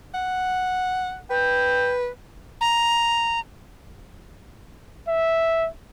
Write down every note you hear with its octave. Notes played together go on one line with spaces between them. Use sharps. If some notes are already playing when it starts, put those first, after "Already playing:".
F#5
B4 G5
A#5
E5